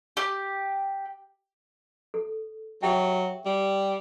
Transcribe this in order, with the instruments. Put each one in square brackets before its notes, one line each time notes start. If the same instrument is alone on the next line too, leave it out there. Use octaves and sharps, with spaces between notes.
[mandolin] G4
[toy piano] A4
[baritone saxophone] F#3 [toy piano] G4 E5 G5
[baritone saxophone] G3